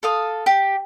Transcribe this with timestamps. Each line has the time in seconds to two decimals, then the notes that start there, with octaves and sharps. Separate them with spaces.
0.03 A4 F5 D#6
0.46 G4